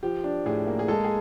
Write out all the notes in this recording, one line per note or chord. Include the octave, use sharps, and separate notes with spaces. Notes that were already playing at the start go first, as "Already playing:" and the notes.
F3 G4
D4
A2 G#4
A#3
G#4
G#3 A4
G#4